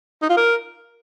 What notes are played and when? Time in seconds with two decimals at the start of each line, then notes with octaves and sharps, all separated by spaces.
0.22 D#4
0.30 F4
0.37 A#4